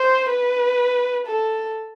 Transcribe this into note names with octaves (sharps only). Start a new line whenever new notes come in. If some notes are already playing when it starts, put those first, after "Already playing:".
Already playing: C5
B4
A4